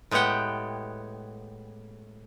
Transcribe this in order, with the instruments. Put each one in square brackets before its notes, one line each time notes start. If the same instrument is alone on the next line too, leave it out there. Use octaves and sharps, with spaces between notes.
[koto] A2 G#3 B3 G4 F#5 G5